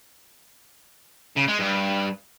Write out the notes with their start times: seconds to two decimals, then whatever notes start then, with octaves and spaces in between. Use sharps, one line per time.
1.36 C#3
1.48 G#3
1.59 G2